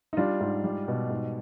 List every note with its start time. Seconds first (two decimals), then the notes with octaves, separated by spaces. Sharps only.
0.13 D#4
0.17 G3 D4 F4
0.41 G#2
0.64 G3
0.88 B2
1.10 G#2